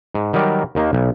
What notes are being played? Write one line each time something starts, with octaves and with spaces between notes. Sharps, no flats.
G#2
D#3 F#3 G3 A#4 D5
D#2 D#3 A#3
B1